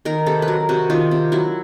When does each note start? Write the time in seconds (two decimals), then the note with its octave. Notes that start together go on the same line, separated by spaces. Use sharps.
0.05 D#3 A#4
0.26 C3 A4
0.42 B4
0.48 F#3 A#4
0.69 C3 F#4
0.90 D#3 F4
1.11 C3
1.32 F#3 E4